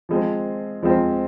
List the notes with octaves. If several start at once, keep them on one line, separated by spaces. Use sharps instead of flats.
F3 G#3 C4
F3 G#3 C4